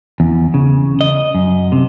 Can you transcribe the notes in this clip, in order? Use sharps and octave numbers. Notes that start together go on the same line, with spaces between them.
E2
C#3
D#5
F#2
C3